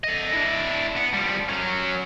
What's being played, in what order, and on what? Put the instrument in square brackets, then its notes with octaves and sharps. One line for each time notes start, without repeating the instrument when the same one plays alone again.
[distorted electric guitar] A4 D#5
D4 E4
B3
F3 G3
F#3 C#4